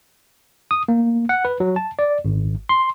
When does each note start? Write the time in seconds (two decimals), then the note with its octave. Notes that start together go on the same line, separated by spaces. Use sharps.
0.71 D#6
0.88 A#3
1.29 F#5
1.45 B4
1.60 F#3
1.76 A5
1.99 D5
2.25 G#1
2.69 C6